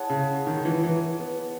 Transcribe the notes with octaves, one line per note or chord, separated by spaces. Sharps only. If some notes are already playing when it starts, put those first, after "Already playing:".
Already playing: E4 G#4 C#5 F#5 A5
C#3
D#3
E3
E3
B3